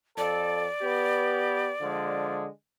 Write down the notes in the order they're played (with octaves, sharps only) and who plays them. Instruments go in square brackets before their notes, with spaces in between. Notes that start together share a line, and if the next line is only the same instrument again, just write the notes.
[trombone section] F2 A4 [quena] D5
[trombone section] B3 G4 B4
D3 F3 G#3